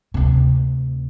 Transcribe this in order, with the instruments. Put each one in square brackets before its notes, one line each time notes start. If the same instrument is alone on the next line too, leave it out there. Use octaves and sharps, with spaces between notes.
[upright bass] D2 C3